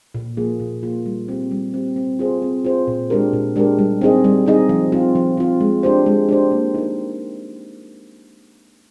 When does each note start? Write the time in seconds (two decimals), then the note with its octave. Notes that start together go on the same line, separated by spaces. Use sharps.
0.15 A#2
0.37 F3 A#3 F4 G#4
0.60 A#2
0.83 F3 A#3 F4 G#4
1.06 G3
1.28 C4 G4
1.51 G3
1.74 C4 G4
1.96 C4
2.19 F4 G#4 C5
2.42 C4
2.64 F4 G#4 C5
2.87 A#2
3.10 G#3 D4 G4 A#4
3.33 A#2
3.56 G#3 D4 G4 A#4
3.79 G3
4.01 C4 D#4 G#4 D#5
4.24 G3
4.46 C4 D#4 G#4 D#5
4.69 F3
4.92 C4 F4
5.15 F3
5.37 C4 F4
5.60 G#3
5.83 D4 G4 C5
6.06 G#3
6.29 D4 G4 C5
6.52 A#3
6.75 D#4 A#4